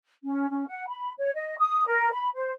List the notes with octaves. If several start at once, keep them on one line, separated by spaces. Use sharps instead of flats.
C#4
C#4
F#5
B5
C#5
D#5
D#6
A#4
B5
C5